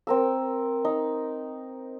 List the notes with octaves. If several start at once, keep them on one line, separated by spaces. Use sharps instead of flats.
C4 A#4 E6
D#4